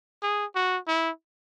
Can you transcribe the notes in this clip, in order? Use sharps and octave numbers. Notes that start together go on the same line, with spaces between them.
G#4
F#4
E4